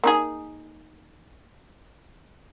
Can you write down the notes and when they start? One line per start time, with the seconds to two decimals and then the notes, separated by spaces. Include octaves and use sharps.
0.04 A#3 D#4 G#4